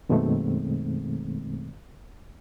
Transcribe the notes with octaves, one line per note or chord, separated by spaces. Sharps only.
F#2 B2 D#3 G#3 A3 C4